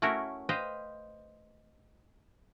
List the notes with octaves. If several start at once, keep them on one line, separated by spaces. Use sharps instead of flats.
A3 C#4 E4 F#4 A#4
B4 C5 D#5 F5 G5